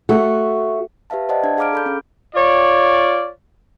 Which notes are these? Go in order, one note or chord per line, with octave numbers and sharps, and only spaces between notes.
A3 F#4
G4 B4 E5 F5 A5
C5 D5 D#5 F#5 A5
D4 D5 A5 G#6
G#4 F5 A#5 D6 F6 D7
A4 B5 G6
C#4 G#4
F4 C#5 D5